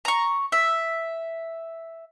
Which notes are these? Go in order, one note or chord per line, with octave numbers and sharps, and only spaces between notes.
A#5 C#6
E5